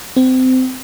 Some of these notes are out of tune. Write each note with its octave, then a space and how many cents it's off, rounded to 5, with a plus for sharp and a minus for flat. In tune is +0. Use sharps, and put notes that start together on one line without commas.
C4 -25